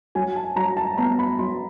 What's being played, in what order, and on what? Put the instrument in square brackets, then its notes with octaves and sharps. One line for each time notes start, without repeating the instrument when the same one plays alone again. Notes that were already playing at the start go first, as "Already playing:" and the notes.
[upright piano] F#3 G#5
A5
F#3 A#5
A5
B3 A#5
B5
F#3 C6